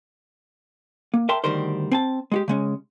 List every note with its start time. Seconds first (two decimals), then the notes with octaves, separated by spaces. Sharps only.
1.14 A#3
1.29 A#4 E5 G5 A5 C6
1.44 D2 D#3 G3 A#4 C5
1.92 C4 G#5 A5
2.32 G#3 F#4 G4
2.48 C#3 G#3 C#4